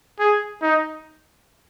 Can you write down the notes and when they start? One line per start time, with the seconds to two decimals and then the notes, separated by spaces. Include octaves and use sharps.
0.19 G#4
0.62 D#4